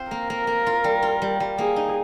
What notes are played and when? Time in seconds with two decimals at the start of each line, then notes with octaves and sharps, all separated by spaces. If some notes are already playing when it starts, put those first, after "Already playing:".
Already playing: C4 F4 C5
0.11 A#3 A#4
0.30 A#3
0.47 A#3
0.66 F4
0.84 G3
1.02 F4
1.22 G3
1.40 G3
1.58 A#3 G#4
1.76 D#4